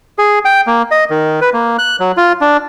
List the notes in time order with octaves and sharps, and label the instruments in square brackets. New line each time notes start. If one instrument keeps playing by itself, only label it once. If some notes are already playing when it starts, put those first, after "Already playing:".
[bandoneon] G#4
G5
A#3
D#5
D#3
B4
A#3
F#6
F#3
F4
D4